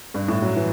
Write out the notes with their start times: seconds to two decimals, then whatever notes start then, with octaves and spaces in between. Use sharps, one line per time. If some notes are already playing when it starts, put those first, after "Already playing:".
0.14 G2
0.28 A2
0.42 F#3
0.57 E3